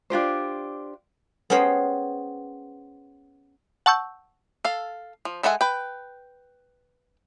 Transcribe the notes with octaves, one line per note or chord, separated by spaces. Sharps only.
D4 F4 G4 C5
B3 C#4 G#4 C5 G5 A#5
F#5 A5 C#6 E6 G6
A4 F5
F3
G#3 A4 E5 F#5 G#5
B4 G5